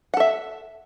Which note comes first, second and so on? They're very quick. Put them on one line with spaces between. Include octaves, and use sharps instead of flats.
F#5 A4 E5